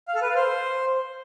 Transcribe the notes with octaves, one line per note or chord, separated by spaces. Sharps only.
F5
A4
B4
F5
C5